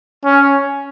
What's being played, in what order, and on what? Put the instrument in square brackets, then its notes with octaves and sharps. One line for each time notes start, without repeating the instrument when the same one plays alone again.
[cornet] C#4